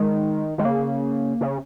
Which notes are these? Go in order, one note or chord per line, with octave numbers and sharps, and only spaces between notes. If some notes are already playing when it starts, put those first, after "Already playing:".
Already playing: D#3 G#3
D#3 G#3
C#3 A#3
C#3